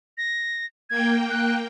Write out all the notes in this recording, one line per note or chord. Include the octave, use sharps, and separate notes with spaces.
A#6
A#3 G5 G#6
F#6